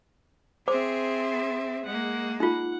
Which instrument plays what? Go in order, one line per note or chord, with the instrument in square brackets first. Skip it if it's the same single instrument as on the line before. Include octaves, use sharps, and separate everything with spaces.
[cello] C4 G#4 [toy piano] C5 D6 [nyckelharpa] E5 C6
[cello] G#3 A#3 [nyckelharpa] F#5
[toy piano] D#4 F4 [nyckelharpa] F#5